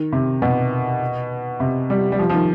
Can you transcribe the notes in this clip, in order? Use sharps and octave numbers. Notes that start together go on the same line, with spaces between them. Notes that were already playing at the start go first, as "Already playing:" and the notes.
Already playing: D#3
C3
B2
C3
G3
G3
F3
F3
D#3